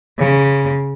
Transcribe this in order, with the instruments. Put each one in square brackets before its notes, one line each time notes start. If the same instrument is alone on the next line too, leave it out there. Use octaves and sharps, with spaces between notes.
[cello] C#3